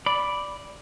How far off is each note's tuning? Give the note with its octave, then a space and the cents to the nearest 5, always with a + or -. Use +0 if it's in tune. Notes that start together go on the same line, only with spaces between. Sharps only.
D5 -5 B5 +0